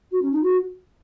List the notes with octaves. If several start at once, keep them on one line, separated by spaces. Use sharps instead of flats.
F#4
C#4
D#4
F#4